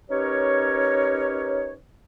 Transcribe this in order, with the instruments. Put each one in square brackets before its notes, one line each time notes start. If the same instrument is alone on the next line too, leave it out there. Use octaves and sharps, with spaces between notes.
[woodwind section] C#4 D#4 G4 A#4 B4 C#5